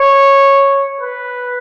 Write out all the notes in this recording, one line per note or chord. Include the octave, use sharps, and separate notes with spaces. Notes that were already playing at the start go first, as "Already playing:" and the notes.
Already playing: C#5
B4